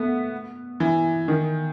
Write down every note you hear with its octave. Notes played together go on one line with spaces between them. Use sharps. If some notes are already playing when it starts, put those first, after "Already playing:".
Already playing: A3 B3
E3
D#3